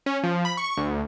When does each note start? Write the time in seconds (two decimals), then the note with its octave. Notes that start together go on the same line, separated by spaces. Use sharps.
0.06 C#4
0.24 F3
0.45 B5
0.57 C#6
0.77 D2